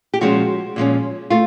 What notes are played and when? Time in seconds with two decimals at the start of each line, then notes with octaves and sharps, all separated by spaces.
0.14 G4
0.21 A#2 F3 G#3 C#4 F#4
0.76 A#2 F3 G#3 C#4
1.30 A3 F4